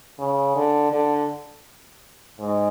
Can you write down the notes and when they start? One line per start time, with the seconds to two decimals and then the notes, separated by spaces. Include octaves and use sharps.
0.19 C#3
0.56 D3
0.92 D3
2.40 G#2